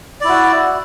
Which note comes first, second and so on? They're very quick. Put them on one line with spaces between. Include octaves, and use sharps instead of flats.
D5 E4 F#4